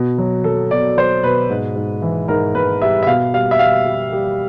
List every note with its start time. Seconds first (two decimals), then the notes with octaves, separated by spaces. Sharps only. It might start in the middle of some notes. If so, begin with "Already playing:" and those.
Already playing: B2
0.18 F#3
0.44 F#3 A4
0.71 B2 D5
0.97 F#3 C5
1.23 B2 B4
1.50 G#2
1.76 G#2
2.02 E3
2.28 G#2 A#4
2.55 G#2 B4
2.81 G3 E5
3.03 E5
3.07 B2 F5
3.33 G3 F5
3.51 E5
3.59 G3 F5
3.86 G3
4.12 G3